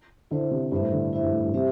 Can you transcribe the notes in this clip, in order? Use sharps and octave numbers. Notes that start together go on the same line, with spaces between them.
D3 E4 C5 E5
C3
G2 E4 C5 E5
A2
D3
E4 C5 E5
G2
A2
G2
C3 C4 G4 C5 E5